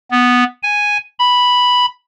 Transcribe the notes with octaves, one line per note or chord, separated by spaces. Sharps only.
B3
G#5
B5